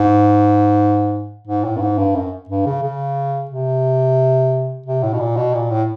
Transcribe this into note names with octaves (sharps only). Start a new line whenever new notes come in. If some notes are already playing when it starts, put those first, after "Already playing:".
Already playing: G#2
G#2
A2
G2
G#2
G2
F#2
G2
C#3
C#3
C3
C3
A2
B2
A#2
B2
A#2
A2